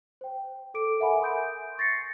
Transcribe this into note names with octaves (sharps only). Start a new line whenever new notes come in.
C5 G5
A4 D6 D7
A#4 E5 F#5 G#5 B5
C6 D#6 G6 D7
C#6 A6 A#6 C7 C#7